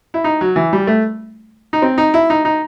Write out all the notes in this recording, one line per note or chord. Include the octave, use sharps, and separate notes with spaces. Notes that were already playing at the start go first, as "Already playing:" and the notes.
E4
D#4
F#3
E3
G3
A3
D#4
C4
D#4
E4
D#4
D#4